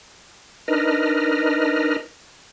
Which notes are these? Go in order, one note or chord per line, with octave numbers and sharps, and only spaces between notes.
D4 D#4 A#4 B4 D#5 F6